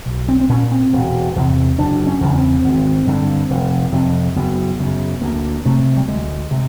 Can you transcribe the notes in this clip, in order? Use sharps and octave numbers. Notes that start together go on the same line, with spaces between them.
B1
C4
C4
A#2 C#4
C4
E1
E2 C3
F#1 D4
C#4
E2 C#3
C#4
C4
G#1
G2 D3
F1
F2 C3
F#1 B3
F#2 C#3
D2 A#3
C3 A3
G3
D2 G#3
C3